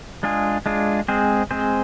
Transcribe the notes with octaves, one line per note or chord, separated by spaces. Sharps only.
G#3 D4 F4 G#4
G#3 D4 F4 G#4
G#3 C4 G#4 C5
G#3 C4 G#4 C5